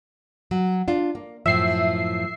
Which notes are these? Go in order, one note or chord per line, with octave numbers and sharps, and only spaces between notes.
F#3
D4 F4
A#3
F#2 A2 F3 E5 C7